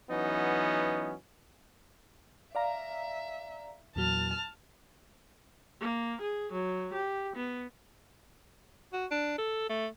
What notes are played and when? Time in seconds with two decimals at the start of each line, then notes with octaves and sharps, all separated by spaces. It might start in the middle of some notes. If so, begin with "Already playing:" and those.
0.10 E3 F#3 B3 C#4 D#4
2.55 D5 E5 F5 A#5
3.96 E2 A#2 F#3 A5 F6
5.81 A#3
6.21 G#4
6.52 F#3
6.94 G4
7.36 B3
8.93 F#4
9.11 D4
9.38 A4
9.69 A3